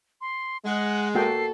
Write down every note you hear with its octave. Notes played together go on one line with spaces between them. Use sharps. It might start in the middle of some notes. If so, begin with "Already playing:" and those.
C6
G#3 F#5
A#3 F#4 A4 G5 C7